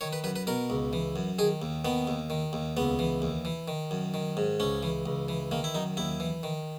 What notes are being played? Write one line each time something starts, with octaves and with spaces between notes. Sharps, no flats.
D#3 C#5
B4
F#2 B4
B4
B2 A#4
C#2
E3
F#2
D#3 G#4
D#2
D#3 B3
D#2
D#3
D#2
C#2 B3
E3
D#2
E3
D#3
F#2
D#3
G#2
C#2 C#4
E3
C#2
E3
D#3 A#3
E4
F#2 D#4
D#2 E4
E3
D#3